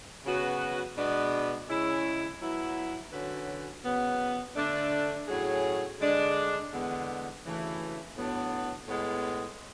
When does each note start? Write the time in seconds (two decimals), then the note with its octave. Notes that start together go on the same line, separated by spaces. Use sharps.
0.25 C#3 F#3 B3 F#4 B4
0.97 B2 G#3 B3 D4
1.69 C#3 G#3 C#4 E4
2.41 F#3 B3 E4
3.12 D3 F#3 C#4 F#4 B4
3.84 C#3 F#3 B3
4.56 D3 A3 D4
5.28 A2 F#3 C#4 G#4
6.00 D3 G#3 D4
6.72 E2 D3 G#3 B3
7.44 D2 C#3 E3 A3
8.16 A2 F#3 B3 D4
8.87 A2 G#3 B3